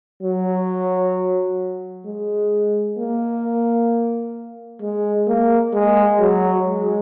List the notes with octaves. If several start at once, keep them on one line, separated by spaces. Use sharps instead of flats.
F#3
G#3
A#3
G#3
A#3
G#3
F#3
G#3